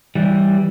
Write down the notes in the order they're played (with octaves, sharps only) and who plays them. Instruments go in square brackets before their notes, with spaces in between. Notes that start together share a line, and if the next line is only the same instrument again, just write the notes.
[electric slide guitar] E3 G3